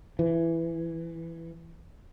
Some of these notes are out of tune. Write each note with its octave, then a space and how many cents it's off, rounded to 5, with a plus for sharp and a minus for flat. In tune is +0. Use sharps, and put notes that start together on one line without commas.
E3 +10